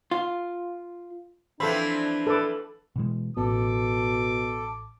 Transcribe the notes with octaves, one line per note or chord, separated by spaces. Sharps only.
F4
E3 F3 C4 D4 A4 B5
A4 B4 D6
B2 E3 G#3
A1 B2 A4 D6